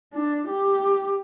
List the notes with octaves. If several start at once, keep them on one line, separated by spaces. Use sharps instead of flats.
D4
G4